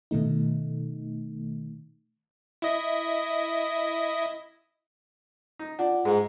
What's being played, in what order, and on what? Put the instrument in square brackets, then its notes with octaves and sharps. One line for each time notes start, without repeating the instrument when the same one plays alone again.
[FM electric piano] B2 D#3 A3 D#4
[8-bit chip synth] E4 D#5
[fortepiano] D#4
[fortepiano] D4 [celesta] F4 F#5
[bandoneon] G#2 [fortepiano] G#3